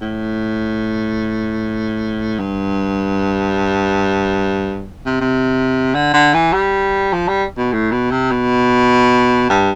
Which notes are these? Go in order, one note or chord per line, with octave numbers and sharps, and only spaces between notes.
A2
G2
C3
C3
D3
D3
E3
G3
F3
G3
B2
A2
B2
C3
B2
G2